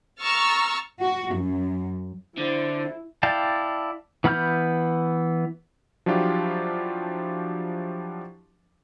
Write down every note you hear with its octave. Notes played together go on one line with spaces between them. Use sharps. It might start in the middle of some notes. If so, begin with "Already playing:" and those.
A#5 C#6 E6 F6 A6
F#4
F#2
D3 E4 C5
E4 D5 F5 G5 A5
E3 B3 B5 F6 G6
F3 F#3 D4 E4 F4 G4